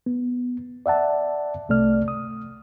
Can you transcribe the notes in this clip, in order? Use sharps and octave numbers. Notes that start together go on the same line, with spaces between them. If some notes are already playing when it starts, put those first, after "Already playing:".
B3
D5 E5 F#5 A5
C2 C3 A3 D5 F6
D#6